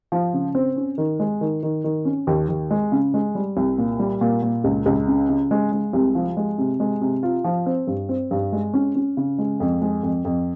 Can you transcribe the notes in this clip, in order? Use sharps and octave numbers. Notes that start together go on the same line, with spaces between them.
F3
C#3
C4
C#4
D#3
G#3
D#3
D#3
D#3
C#4
D#2
D#2
G#3
C#3
G#3
G3
C2
A#2
G3
A#2
A#2
C#2
C#2
C#3
C#3
G#3
G#3
C2
F3
G#3
C3
G#3
C3
F4
F3
C4
G2
C4
G2
G#3
C#4
C#4
C#3
G#3
F2
G#3
F2
F2